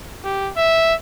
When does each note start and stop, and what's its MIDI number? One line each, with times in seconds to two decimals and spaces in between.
0.24 0.51 67
0.57 0.94 76